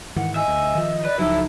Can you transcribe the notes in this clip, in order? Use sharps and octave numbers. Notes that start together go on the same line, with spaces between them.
G#2 D#3 E3 F#5
D#5 E5 G#5
D2
D#3 F3
B4 D5
C#2 F3 F#3 D#4 E4 A4 E5